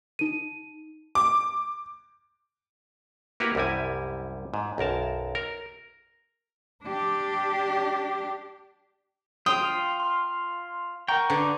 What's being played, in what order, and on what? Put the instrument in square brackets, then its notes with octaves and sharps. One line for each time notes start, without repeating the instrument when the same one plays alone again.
[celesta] D#4 D#7
[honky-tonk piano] D6
[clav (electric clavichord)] A#3 E4 F#4 G4 A#4 B4
C2 F#2 G3 E4 G#5
G#2
B1 F#2 A#4 A5
A#4
[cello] D4 G4
[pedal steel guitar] F4 [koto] G5 [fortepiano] D#6
[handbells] C6 F6
[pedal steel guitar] A#4 G5 [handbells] F#5 A#5 C#6
[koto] D3 [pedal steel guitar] D#4 D5 [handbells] B4